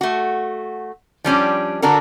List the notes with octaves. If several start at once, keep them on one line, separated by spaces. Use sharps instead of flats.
A3 F#4
F3 G3 C#4 D4
D3 D4 F#4 A4 A#4